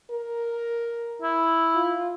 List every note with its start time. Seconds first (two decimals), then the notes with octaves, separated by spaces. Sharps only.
0.11 A#4
1.22 E4
1.75 F4